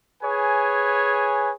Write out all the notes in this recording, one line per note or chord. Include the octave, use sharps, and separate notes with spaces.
G#4 B4 C#5 G#5